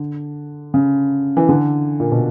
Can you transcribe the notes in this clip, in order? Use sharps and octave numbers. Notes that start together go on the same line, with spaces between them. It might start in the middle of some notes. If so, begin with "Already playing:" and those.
Already playing: D3
C#3
E3
D3
A#2
B2